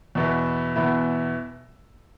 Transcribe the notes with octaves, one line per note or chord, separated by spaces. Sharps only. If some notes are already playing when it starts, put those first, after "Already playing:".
E2 B2 B3 E4
E2 B2 B3 E4